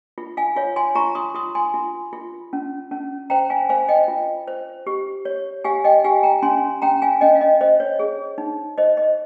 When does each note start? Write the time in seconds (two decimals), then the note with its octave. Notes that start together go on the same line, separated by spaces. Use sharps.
0.18 F4
0.37 F5 G#5
0.56 F4 C#5 F5
0.76 G#5 C6
0.95 F4 A#5 C#6
1.15 C6 D#6
1.35 F4 C6 D#6
1.55 G#5 C6
1.74 F4
2.13 F4
2.53 C#4
2.91 C#4
3.30 C5 G5 A#5
3.50 F5 G#5
3.69 C5 F5 G#5
3.88 D#5 G5
4.08 F4
4.48 C5
4.87 G4
5.25 C#5
5.64 G4 F5 G#5
5.84 D#5 G5
6.04 G4 F5 G#5
6.23 G5 A#5
6.42 C#4 G#5 C6
6.82 C#4 G5 A#5
7.02 F5 G#5
7.21 C#4 D#5 G5
7.35 F5
7.41 D#5
7.61 C5 D#5
7.80 C#5
7.99 G#4
8.38 D#4
8.78 C5 D#5
8.97 D#5